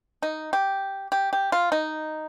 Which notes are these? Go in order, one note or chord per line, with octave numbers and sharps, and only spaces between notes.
D#4
G4
G4
G4
F4
D#4